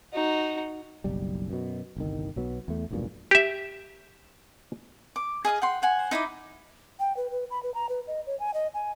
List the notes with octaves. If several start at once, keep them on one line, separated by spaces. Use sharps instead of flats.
D#4 F#4
F#1 B1 G3
F#2 B2
G1 C2 D#3
B1 F#3 B3
E2 A3
F1 B1 G2 A#2
G4 E5
D6
G#4 D#5 F5 D#6
F#5 G5 C6
C5 F#5 G#5
D#4 E4 D#5 D6
G5
B4
B4
B5
B4
A#5
B4
D#5
C#5
G#5
D#5
G#5